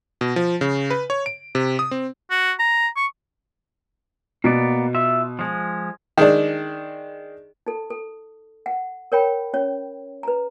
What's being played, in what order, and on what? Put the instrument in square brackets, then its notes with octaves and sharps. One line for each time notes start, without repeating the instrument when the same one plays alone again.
[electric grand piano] B2
F3
C#3
B4
C#5
D7
C3
D#6
C4
[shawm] F#4
A#5
C#6
[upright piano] B2 [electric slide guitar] A#3 B3 D5
[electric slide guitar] F4 E5
F3 G#3
[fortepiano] D#3 G#3 D4
[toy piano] D#4 A4
A4
F#5
A#4 C#5 G5 B5
C#4 C#5
B4 A#5